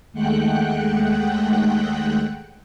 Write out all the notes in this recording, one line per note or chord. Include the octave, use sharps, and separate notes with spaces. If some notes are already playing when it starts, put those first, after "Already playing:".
D#2 G#3 A3 F#5 G5 F#6